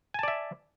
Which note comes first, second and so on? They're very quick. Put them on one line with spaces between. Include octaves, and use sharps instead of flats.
G#5 A5 D5 E5